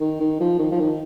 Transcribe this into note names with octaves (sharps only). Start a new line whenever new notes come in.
D#3
D#3
F3
D#3
F3
D#3